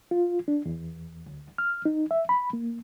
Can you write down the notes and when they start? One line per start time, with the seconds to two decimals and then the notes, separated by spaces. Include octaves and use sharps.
0.11 F4
0.48 D4
0.66 E2
1.26 D2
1.58 F6
1.85 D#4
2.11 E5
2.29 B5
2.53 A#3